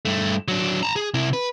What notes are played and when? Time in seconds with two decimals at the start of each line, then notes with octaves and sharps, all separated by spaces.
0.05 G2 A3
0.48 F#3 D4
0.83 A5 A#5
0.96 G#4
1.14 C3 E4
1.33 B4